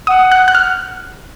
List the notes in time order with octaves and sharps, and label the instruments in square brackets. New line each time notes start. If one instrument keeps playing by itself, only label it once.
[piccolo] F#5 [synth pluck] D#6
[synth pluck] F#6
F#6
F6